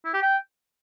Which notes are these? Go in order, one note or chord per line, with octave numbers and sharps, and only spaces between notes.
E4
G4
G5